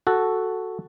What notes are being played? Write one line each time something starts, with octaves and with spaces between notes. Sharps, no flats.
F#4 A4